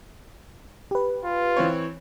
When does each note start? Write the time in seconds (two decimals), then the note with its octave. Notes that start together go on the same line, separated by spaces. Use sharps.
0.91 G4 B4
1.24 F4
1.56 E3 C4 C#5